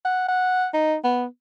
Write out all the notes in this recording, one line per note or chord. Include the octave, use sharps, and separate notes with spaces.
F#5
F#5
D#4
B3